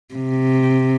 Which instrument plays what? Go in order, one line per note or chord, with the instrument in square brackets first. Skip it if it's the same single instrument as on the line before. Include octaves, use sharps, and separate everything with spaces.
[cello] C3